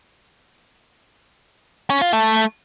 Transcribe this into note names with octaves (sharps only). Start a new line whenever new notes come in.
C#4
F4
A3